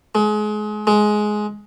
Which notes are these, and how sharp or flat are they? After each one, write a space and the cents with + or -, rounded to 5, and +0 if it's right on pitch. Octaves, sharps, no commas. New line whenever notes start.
G#3 +30
G#3 +15